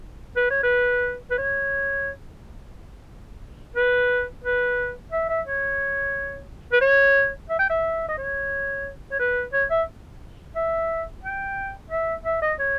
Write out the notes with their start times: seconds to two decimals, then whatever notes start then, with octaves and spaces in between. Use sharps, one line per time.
0.37 B4
0.50 C#5
0.63 B4
1.31 B4
1.38 C#5
3.76 B4
4.44 B4
5.12 E5
5.29 E5
5.46 C#5
6.73 B4
6.81 C#5
7.50 E5
7.59 G5
7.70 E5
8.09 D#5
8.18 C#5
9.12 C#5
9.20 B4
9.53 C#5
9.71 E5
10.56 E5
11.24 G5
11.91 E5
12.25 E5
12.42 D#5
12.59 C#5